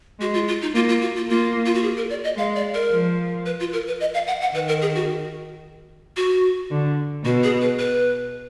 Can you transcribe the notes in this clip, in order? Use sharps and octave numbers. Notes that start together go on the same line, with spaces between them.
G#3 F#4
F4
F4
D#4
A#3 F4
F4
F#4
F4
A#3 F4
F4
F#4
G#4
A#4
D5
D#5
G#3 F5
D5
A#4
F3
B4
F4
A#4
B4
D#5
F5
F#5
F#5
D#3 B4
A#4
G#4
F#4
F#4
D3
B2 F#4
G#4
B4
B4